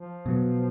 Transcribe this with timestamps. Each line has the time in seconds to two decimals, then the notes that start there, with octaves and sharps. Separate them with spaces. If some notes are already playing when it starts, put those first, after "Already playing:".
Already playing: F3
0.26 B2 F#3 B3